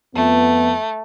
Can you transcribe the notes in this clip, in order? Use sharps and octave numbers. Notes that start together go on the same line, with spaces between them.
F2 A3 B3